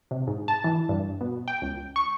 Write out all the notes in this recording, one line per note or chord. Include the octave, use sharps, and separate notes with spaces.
C3
G#2
A5
E3
G2
B2
G5
C#2
C#6